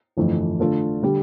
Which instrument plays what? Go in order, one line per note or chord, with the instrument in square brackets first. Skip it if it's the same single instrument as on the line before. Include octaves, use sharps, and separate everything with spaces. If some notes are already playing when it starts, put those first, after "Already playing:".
[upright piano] G1 F2 E3 A3
D3 A3 D4 F4 A4
D3 G3